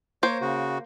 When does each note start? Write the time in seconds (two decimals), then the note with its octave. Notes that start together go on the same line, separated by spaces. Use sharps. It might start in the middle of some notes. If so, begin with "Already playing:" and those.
0.23 A#3 C5 C#5
0.41 C#3 F#4